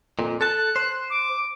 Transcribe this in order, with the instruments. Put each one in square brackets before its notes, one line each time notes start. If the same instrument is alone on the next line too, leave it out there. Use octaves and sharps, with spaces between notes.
[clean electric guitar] F2 A#2
[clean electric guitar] A4 A5 [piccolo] F#6
[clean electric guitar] C5
[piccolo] D6